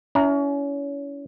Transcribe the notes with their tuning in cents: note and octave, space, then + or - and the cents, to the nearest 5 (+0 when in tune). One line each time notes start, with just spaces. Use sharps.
C#4 +30 E4 +0 A#5 -10